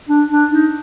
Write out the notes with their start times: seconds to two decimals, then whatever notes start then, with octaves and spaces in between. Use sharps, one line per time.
0.09 D4
0.30 D4
0.52 D#4